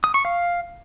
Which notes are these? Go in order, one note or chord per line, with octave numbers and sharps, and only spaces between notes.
D#6
C#6
F5